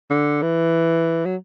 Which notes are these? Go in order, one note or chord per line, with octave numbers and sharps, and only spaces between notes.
D3
E3
F#3